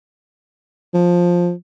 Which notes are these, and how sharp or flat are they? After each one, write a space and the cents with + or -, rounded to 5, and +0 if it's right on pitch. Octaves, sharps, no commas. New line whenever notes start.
F3 +10